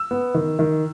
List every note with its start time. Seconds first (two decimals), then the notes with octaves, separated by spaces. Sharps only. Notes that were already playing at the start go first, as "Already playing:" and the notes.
Already playing: E6
0.11 B3
0.34 D#3
0.59 D#3